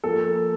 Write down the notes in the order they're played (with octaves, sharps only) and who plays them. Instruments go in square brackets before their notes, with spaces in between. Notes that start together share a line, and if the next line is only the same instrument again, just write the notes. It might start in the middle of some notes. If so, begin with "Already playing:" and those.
[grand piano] F3 A#3 A4